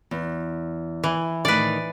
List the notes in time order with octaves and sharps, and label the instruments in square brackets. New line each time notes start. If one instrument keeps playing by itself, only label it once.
[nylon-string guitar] E2
[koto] E3
[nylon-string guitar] A2 D#3 [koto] B4 D5